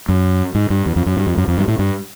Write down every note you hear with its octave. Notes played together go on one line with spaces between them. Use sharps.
F#2
G#2
G2
E2
F2
F#2
G2
F2
F#2
F2
G2
A2
G2